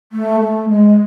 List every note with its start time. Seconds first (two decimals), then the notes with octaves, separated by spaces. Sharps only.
0.12 A3
0.40 A3
0.69 G#3